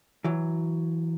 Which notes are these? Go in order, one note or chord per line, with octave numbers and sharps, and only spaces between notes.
E3 F#3